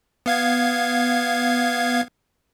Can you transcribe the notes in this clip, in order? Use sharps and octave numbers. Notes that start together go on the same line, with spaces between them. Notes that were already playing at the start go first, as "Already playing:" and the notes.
B3 F5 G#6